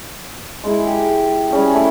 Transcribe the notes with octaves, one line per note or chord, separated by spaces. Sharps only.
G#3 E4
G4
G3 C#4 G#4
A3 E4